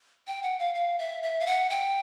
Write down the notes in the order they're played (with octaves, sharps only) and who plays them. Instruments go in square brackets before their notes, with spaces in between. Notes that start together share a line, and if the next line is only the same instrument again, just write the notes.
[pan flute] G5
F#5
F5
F5
E5
E5
F5
F#5
G5